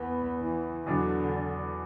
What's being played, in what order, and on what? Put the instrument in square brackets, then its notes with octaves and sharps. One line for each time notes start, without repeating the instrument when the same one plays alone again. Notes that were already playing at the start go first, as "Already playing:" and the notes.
Already playing: [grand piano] E2 [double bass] B3
[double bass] E3
[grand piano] E2 B2 F#3 D4 [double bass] D3